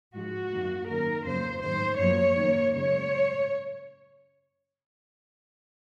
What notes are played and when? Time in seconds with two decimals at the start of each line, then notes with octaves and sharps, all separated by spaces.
0.14 G#2 F3 G#3 F#4
0.51 F#2 D#3 A#3
0.88 F#2 D#3 F#3 A#3 A#4
1.25 F2 C#3 F#3 A#3 C5
1.62 G#2 D#3 F#3 C5
1.98 F#2 F3 A#3 C#5
2.36 F#2 D#3 A#3
2.72 F#2 C#3 G#3 C#5